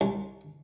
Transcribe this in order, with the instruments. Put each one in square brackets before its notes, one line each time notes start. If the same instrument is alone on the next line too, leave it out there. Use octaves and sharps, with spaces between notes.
[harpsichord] C2